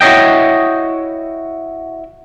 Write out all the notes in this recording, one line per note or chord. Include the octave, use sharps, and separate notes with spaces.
E4 F#4 C#5 D#5 G5